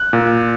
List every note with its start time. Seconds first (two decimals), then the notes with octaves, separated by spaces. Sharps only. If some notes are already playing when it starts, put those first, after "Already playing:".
Already playing: F#6
0.13 A#2